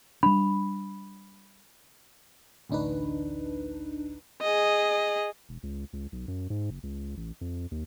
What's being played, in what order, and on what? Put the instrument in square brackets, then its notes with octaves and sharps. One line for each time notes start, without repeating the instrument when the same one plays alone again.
[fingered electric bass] G3 D4 [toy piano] B5
[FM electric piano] A1 D2 D4 D#4 B4
[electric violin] G#4 D#5
[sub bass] E1
C#2
C#2
B1
F#2
G#2
F#1
C#2
A1
F2
D#2